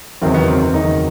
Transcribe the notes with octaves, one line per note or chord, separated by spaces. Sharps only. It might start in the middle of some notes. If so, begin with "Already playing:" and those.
F#1 E2 D#3 F#3 C4
B3
C4
C4
F#1 E2 D#3 F#3 D#4